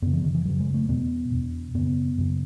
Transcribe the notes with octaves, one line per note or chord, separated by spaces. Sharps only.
F#2 C#3 B3
E3
D#3
E3
F#2 C#3 F#3
G#3
A3
E2 B2 B3
E2 B2
F#2 C#3 B3
F#2 C#3